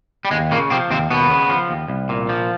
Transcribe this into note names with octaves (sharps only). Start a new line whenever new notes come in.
G3
D#2 G#3
A#2 C#3 A#3
C3 F3 C4
D#2 C3 C4
D#2 B2 B3
C#3
F3
D#2
C2
A#2
F3